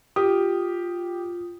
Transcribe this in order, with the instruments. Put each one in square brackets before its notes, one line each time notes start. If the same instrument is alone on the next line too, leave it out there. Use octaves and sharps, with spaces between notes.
[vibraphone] F4 [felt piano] G4 [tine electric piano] D#6